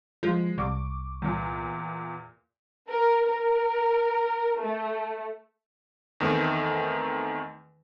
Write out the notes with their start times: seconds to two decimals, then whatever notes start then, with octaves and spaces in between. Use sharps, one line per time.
0.23 F3 G#3
0.58 C2 C#6 D6
1.22 E2 A#2
2.89 A#4
3.27 A#4
4.60 A3
6.20 E2 D#3 A3 C4 D#4